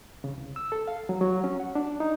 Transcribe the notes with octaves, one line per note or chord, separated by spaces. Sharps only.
C#3
C2
E6
A4
F5
F#3
F#3
C#4
F#5
D4
D#4